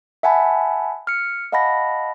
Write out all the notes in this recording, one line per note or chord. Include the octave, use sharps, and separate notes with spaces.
E5 F#5 G#5 A5 B5
F6 C#7
D#5 F5 F#5 A5 B5 A#6